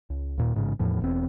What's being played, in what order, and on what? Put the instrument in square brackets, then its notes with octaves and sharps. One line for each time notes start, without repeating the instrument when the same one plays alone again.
[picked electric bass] C#2
D#2 A#2
A1 G#2 C#3
E2 A2 F3
E1 E2 C4